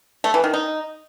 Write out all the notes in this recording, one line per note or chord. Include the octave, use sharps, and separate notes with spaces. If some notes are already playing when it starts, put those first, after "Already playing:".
A3
E3
D#3
D#4